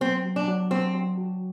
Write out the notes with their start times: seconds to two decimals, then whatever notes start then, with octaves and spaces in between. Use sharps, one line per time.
0.01 F#3 C4
0.24 F#3
0.36 D4
0.48 F#3
0.70 F#3 C4
0.95 F#3
1.18 F#4